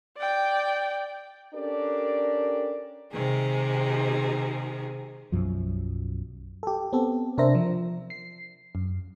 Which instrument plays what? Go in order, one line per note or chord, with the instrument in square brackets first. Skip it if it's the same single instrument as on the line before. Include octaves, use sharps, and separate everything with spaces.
[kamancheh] D5 G5
[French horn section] C#4 D4 G4 A4 A#4 D5
[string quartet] C3 D#3 G#3 G#4
[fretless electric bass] B1 F#2 F3
[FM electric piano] G4 A4
B3 C4 G4 A4
C3 D4 A#4 C5 E5 A#6
F3
C7
F#2